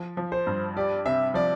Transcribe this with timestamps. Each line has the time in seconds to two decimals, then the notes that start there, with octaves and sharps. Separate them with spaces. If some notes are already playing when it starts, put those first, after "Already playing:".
Already playing: F3
0.17 F3
0.32 C5
0.47 G2
0.77 G4 D5
1.05 C3 E5
1.34 F3 D5